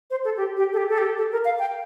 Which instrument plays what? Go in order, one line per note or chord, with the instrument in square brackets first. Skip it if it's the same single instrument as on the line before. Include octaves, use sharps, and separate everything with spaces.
[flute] C5
A4
G4
G4
A4
G4
A4
G4
A4
A#4
F5
G5